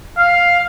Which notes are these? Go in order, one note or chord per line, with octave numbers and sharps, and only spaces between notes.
F5